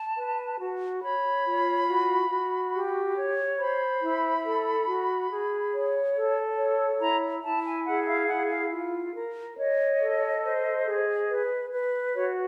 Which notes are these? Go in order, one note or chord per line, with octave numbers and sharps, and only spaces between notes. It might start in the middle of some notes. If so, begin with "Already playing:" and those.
Already playing: A5
B4
F#4
C#5 B5
F4
F#4
F#4
G4
C#5
C5 B5
E4
A4
F#4
G#4
C#5
A4
C#5
E4 A#5
E4 A5
G#5
G#4 F#5
F5
E4 F#5
F5
F4
A#4
C#5 D#5
A4
C5
G#4
B4
B4
F#4 C#5